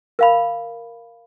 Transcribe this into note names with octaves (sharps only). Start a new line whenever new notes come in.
A#4 F5 B5